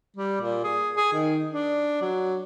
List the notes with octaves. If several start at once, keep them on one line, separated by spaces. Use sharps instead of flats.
G3
A#2
G#4
G#4
D#3
D4
F#3